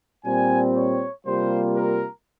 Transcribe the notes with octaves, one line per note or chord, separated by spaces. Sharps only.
A#2 G3 C4 G#5
C#5
C3 G3 A#3 F4 C5
A#4